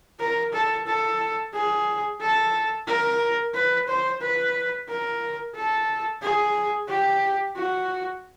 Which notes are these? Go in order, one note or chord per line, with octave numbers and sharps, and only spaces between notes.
A#4
A4
A4
G#4
A4
A#4
B4
C5
B4
A#4
A4
G#4
G4
F#4